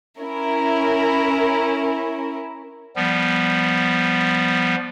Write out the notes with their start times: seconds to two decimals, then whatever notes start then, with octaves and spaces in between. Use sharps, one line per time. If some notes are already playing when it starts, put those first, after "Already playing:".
0.19 C#4 E4 A#4
2.96 F3 G3 B3